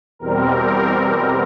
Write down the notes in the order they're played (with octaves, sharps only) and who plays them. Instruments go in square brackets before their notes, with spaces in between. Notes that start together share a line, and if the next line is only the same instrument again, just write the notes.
[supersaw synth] E2 B2 G3 C4 A#4